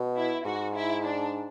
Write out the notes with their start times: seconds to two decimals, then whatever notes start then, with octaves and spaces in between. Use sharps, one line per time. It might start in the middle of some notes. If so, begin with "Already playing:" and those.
Already playing: B2
0.16 E4
0.45 G#2 F#4
0.76 E4
1.05 D4